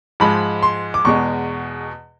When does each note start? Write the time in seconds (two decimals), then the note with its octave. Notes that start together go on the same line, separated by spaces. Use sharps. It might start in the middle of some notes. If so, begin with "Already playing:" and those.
0.20 G#2 F3 G#3 B5
0.63 C6
0.94 D6
1.05 E2 B2 G#3 C#6